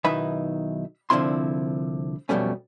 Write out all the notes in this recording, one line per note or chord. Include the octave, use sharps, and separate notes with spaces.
B1 D#3 D#4 E4 B4 E5
C2 D3 F3 C4 E4 C6
B1 F2 B2 G3 A3 C#4